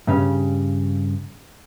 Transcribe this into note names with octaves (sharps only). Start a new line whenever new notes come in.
G2 C#3 C#4